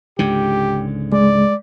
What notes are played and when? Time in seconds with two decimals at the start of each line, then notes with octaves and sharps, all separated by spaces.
0.19 C#2 G#2 D3 G4
1.12 G#3 D5